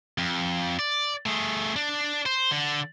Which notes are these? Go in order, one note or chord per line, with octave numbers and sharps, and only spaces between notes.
F2
D5
A3 G#4
D4
C5
D3